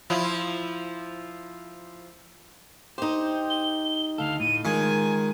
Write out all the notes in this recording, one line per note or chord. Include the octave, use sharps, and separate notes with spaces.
F3 E4 F4
D#4 G4 C5
G7
D2 A4 F5
A2 D#7
D#3 G#3 F4 G#5